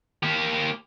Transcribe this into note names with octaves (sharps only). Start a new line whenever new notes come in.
A#3 G4